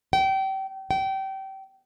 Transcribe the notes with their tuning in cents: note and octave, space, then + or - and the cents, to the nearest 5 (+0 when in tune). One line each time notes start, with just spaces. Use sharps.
G5 -30
G5 -25